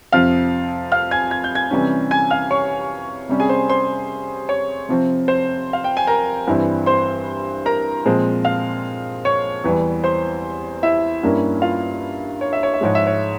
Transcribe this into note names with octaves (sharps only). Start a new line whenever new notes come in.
F2 C3 F3 F5 F6
F5 F6
G#5 G#6
G#6
G6
G#5 G#6
C3 E3 G3 C#4
G#5 G#6
F5 F6
C#5 C#6
C3 G3 C#4
G#4 G#5
C5 C6
C5 C6
C#5 C#6
C3 F3 C4
C5 C6
F5
G5
G#5
A#4 A#5
G2 E3 G3 C4 E4
C5 C6
A#4 A#5
A#2 F3 G#3 C4
F5 F6
C#5 C#6
E2 E3 G3
C5 C6
E4 E5
G2 G3 A#3 C#4 E4
F4 F5
C#5
E5
C#5
E5
G#2 F3 G#3 C#5
E5
C#5